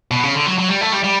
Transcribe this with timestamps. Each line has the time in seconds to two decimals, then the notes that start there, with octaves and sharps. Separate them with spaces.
0.11 B2
0.24 C#3
0.35 D3
0.46 F#3
0.58 F#3
0.69 G3
0.81 A3
0.92 G3
1.04 G3